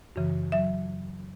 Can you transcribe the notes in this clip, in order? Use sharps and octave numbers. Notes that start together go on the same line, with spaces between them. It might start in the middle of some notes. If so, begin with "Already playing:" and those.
F#2 C#3 E3
F#3 E5